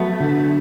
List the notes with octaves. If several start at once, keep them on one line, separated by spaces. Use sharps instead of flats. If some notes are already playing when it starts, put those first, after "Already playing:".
Already playing: F#3 A3 B3
D3